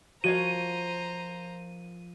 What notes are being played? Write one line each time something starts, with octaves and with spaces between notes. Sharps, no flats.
F3 F#4 A#4 C5 C#5 F5 A#5 D#7